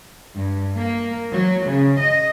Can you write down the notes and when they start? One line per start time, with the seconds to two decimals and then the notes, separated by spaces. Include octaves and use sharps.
0.36 G2
0.78 A#3
1.32 F#3
1.68 C#3
2.00 D#5